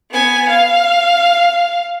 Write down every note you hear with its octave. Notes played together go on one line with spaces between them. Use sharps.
B3 G#5
F5